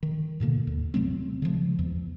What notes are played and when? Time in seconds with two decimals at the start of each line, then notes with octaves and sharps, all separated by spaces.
0.03 D#3
0.40 G#2 B2 D3 A#3
0.67 D#2
0.94 C3 F#3 A3 C4
1.42 C#3 E3 F3 G#3
1.79 E2